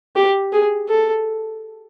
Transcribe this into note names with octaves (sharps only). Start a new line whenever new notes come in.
G4
G#4
A4